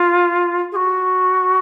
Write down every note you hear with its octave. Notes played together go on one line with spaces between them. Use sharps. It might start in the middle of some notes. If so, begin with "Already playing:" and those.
Already playing: F4
G#4
F#4